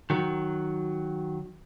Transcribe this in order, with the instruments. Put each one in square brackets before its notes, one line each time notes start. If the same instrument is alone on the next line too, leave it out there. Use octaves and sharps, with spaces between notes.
[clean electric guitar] D#3 F#3